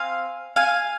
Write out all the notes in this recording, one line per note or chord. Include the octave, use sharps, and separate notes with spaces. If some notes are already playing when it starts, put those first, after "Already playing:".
Already playing: C4 F5 G#5
F5 G#5